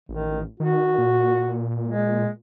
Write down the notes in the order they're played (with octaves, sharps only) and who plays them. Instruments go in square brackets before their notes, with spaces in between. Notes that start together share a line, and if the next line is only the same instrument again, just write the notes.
[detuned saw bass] A1 [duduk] D#3
[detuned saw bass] D#3 [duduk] F#4
[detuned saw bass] A#2
[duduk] G#3